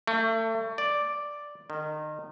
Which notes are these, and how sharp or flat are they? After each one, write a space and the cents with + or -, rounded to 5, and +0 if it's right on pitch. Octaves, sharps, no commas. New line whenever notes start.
A3 +35
D5 +0
D#3 -25